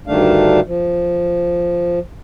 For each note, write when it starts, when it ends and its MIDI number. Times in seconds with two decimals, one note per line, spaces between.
0.07 0.60 38
0.07 0.60 43
0.07 0.60 51
0.07 0.60 57
0.07 0.60 62
0.07 0.60 77
0.67 1.99 53